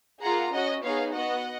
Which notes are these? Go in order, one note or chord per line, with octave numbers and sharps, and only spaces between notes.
A#3 F4 G#4 F#5 A#5
C#4 F#4 D#5 F#5
B3 D#4 G#4 C#5 F5
B3 F#4 D#5 F#5